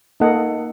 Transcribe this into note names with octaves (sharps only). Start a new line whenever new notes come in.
A#3 D#4 A4 D#5 F#5